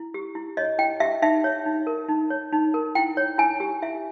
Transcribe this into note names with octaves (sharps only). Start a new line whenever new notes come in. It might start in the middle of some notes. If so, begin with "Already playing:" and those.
Already playing: E4
G4
E4
C#5 D#5
E4 G5
G4 E5
D#4 E5
C#5
D#4
A#4
D#4
C#5
D#4
A#4
E4 G5
C#5
E4 G#5
G4
E4 E5